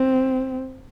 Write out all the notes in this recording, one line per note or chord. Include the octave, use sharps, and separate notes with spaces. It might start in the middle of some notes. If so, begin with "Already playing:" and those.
Already playing: C4